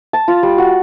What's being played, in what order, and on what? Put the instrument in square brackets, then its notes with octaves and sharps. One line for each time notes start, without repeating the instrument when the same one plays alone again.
[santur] A5
F4
G3
F#4